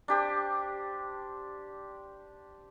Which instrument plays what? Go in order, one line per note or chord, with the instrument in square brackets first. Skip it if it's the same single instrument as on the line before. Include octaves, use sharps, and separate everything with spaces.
[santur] D4 G4 C5